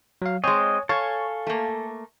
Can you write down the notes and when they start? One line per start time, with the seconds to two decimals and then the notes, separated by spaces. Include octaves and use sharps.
0.22 F#3 F5
0.44 G#3 C4 C#5 D#5 G#5
0.89 A4 C#5 F5 G#5 A5
1.47 A3 A#3